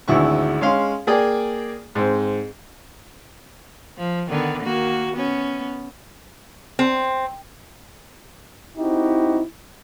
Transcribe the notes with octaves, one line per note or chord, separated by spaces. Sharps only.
G#1 D2 E4 F#4 C#6
G#3 C#4 F5 C6
A#3 G#4 D5 G5 G#5
G#2 C4
F3
D3 D#3 B3
D#3 A#3 F#4
B3 C#4
C4
C4 D#4 E4 F#4 G4